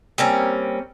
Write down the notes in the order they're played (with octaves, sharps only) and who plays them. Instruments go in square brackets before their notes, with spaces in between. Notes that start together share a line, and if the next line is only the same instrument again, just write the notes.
[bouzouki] G3 A#3 C4 C#4